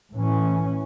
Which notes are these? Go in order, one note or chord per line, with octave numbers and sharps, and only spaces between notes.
A2 E3 C#4